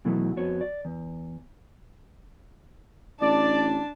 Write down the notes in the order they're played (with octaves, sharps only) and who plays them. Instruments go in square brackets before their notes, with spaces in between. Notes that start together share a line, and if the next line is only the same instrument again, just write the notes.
[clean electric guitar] B2 E3 F#3 A3
F2 B3 F#4 C#5
D5
E2
[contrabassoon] A1 [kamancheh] D4 A5 [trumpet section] D5